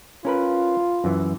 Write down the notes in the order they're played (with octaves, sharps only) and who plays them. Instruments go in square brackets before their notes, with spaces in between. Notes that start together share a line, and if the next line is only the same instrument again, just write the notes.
[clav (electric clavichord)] C#4 A#4 B4 [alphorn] F4
[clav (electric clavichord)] F#2 E3